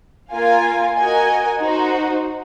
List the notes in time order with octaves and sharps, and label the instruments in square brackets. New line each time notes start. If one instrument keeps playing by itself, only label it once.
[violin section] A#3 F4 A#4 F5 G#5
F#4 A#4 D#5 G#5
D#4 F#4 C5